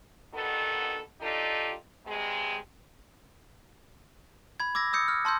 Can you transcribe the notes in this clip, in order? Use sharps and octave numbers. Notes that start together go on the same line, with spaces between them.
G2 B2 D#3 B3 A4
D4 D#4 F4 G4 A4
G2 C3 G#3
B5 G#6
D6 E6 G#6 A#6
D#6 E6 G6 C#7
F6
A5 C6 E6 G6